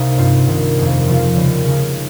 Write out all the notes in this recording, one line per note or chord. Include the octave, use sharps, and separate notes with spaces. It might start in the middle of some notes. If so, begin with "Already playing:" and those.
Already playing: C2 C3 A#3 D#4
G2 G3 C4 F4
C2 C3 D#3
F2 D#3 G#3
C#3 F3 C4 F4
D#2 C#3 G3
C#3 G#3 D#4